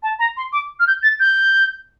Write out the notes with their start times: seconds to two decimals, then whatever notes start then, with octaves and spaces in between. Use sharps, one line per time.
0.02 A5
0.19 A#5
0.36 C6
0.52 D6
0.79 F6
0.87 G6
1.02 A6
1.19 G6